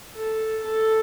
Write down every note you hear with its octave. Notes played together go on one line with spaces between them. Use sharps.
A4
A4